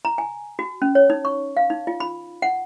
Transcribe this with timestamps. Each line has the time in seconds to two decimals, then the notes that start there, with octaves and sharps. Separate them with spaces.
0.05 A#5
0.18 G#5
0.59 F#4
0.82 C#4
0.95 C#5
1.10 D#4
1.25 C#6
1.57 F5
1.70 D#4
1.87 F4
2.00 B5
2.42 F#5